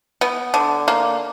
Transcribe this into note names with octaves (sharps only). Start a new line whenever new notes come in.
B3
D3
A#3